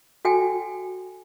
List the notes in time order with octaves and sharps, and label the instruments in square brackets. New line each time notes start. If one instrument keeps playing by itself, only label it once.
[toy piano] F#4 A4 G5 G#5